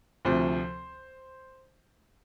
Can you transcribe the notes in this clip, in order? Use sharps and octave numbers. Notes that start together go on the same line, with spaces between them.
D2 C3 F3 C5